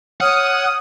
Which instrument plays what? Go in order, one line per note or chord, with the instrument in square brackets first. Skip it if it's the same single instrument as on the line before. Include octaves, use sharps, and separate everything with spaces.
[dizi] C#5 [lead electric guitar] F#5 [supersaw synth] D#6 [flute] F6